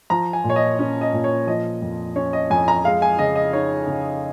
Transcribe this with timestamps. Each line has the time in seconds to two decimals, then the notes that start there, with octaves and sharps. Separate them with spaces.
0.10 F3 A#5
0.33 G#5
0.44 A#2
0.50 C#5
0.56 D#5
0.79 C#4
1.01 D#5
1.13 A#2
1.24 C#5
1.47 F3 D#5
1.82 F2
2.16 C#4 C#5
2.33 D#5
2.50 F2 G#5
2.68 A#5
2.84 G#3 F5
3.02 G#5
3.19 C#3 D#5
3.35 D#5
3.53 D#4 C#5
3.87 C#3